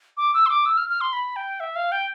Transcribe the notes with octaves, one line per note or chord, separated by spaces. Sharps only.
D6
E6
C6
D6
E6
F6
F6
C6
B5
G5
E5
F5
G5